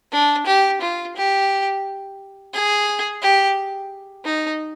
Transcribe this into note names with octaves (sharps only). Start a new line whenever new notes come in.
D4
G4
F4
G4
G#4
G4
D#4